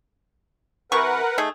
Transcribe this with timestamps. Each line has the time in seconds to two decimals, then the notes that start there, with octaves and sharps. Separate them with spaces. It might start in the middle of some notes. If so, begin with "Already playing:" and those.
0.92 C3 E3 A#4 B4 F#5 C#6
1.38 A3 D#4 G#4